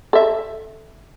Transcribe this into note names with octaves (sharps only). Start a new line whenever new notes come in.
A4 E5